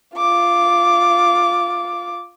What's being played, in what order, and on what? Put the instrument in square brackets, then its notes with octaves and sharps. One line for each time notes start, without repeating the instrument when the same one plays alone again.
[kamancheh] F4 D6